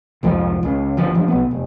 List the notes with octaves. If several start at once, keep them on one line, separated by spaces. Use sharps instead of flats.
C2 F2 G#2 F3
C#2 C#3
G1 F3
G2 F3
B1 B3
F1